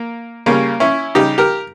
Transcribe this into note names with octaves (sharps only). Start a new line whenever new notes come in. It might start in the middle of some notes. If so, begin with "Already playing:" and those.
Already playing: A#3
C#3 G3 A#3 C#4
C#4 E4
C#3 G3 D#4 G4
G4 A#4